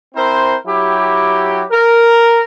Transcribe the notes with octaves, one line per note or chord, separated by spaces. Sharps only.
C4 E4 A#4 C5
F#3 E4 G4
A#4